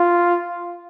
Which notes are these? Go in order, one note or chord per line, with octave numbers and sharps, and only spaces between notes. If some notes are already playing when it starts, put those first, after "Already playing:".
Already playing: F4